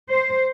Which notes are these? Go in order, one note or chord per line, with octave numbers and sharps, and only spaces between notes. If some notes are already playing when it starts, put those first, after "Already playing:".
C5